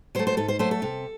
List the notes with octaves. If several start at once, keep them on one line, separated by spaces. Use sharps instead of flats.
F#3 A3 C5
C5
G#2 A4
C5
F#3 A3 C5
A4
C3